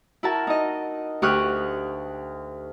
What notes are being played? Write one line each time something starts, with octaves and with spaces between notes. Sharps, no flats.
E4 F#4 A#4 A5
D#4 D#5
D2 G4 C#6 D#6 F6 F#6